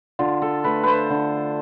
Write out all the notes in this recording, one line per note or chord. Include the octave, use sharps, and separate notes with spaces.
D3 F4
A4
A3 B4
B4 C5
D3